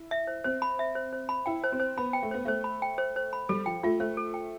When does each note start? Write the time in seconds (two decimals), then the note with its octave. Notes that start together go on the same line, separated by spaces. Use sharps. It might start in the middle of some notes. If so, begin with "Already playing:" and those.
Already playing: E4
0.11 E5
0.27 C5
0.44 C4 C5
0.62 B5
0.79 E5
0.95 C5
1.13 C5
1.29 B5
1.46 E4 G5
1.63 C5
1.72 C4
1.80 C5
1.97 B3 B5
2.13 G5
2.22 A3
2.31 B3 C5
2.45 A3 C5
2.64 B5
2.82 G5
2.98 C5
3.16 C5
3.33 B5
3.49 G3 A4
3.66 F3 G5
3.83 A3 F4
4.00 A3 C5
4.17 A4
4.34 G5